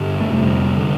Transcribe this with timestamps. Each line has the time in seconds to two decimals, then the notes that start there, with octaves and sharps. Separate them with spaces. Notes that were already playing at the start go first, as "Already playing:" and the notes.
Already playing: G2 D3
0.20 A3
0.31 F2 C3 G3
0.77 D3